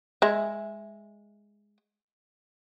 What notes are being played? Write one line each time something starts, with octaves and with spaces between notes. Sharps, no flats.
G#3 E5